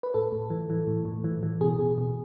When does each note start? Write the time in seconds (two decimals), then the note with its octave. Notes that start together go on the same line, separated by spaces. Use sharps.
0.03 B4
0.14 A2 A4
0.32 A2
0.50 E3
0.70 E3
0.87 A2
1.05 A2
1.24 E3
1.43 E3
1.61 B2 G#4
1.79 B2
1.98 B2